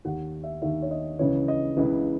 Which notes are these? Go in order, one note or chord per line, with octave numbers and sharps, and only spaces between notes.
D#2 D#3 F#5
E5
D#2 D#3 E5
C#5
D#5
C#2 C#3 E3 C#5
D#5
C#2 C#3 E3